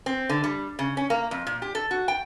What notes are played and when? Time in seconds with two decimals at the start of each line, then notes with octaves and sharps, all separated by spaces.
0.06 C4
0.29 D3
0.44 G3
0.79 C#3
0.97 C#4
1.10 A#3
1.31 F2
1.47 A#2
1.62 G4
1.75 A4
1.91 F#4
2.08 G5